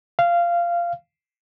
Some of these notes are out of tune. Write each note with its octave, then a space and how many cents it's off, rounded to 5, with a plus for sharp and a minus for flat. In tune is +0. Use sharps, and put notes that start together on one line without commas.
F5 -15